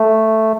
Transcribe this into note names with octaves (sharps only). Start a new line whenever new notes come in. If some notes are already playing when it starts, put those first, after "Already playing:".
Already playing: A3